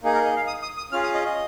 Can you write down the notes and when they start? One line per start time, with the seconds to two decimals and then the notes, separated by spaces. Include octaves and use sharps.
0.03 A#3 D#4 G#4
0.14 A#4
0.25 D#5
0.36 F5
0.47 D#6
0.62 D#6
0.77 D#6
0.92 C#4 F4 G#4 F6
1.03 D#6
1.14 D#5
1.25 D#5